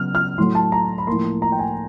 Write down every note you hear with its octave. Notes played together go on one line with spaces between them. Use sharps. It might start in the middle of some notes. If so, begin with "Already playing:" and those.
Already playing: C#3 F#3 B3 F6
F6
A2 F#3 A3 C6
A5
A#5
B5
A2 F3 A#3 C6
A#5
G5
G#5